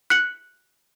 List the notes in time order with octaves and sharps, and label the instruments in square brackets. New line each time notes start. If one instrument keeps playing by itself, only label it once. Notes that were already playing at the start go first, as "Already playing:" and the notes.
[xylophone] F#6 C#7 F#7